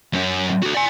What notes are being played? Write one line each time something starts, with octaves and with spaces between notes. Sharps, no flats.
F#2 C#4
F#4 A4
D5 G#5